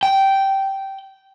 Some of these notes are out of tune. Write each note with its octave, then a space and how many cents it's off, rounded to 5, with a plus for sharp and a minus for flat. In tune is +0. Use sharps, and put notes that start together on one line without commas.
G5 -10